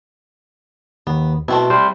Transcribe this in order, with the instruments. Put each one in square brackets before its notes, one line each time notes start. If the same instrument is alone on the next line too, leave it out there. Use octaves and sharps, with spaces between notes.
[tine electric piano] D#2 [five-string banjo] B3
[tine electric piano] B2 [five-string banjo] A3 C4 E4
[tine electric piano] G3 C5